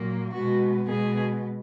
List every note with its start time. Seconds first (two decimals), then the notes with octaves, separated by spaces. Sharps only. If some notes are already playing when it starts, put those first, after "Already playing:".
Already playing: A#2 F#3 A#3
0.33 B2 G#3 B3 F#4
0.88 B2 G#3 B3 G#4